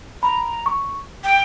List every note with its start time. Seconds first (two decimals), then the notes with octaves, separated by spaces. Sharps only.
0.22 A#5 B5
0.66 C#6
1.24 G5